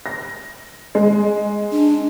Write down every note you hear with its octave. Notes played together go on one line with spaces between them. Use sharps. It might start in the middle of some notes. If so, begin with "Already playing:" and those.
A#6
G#3
D4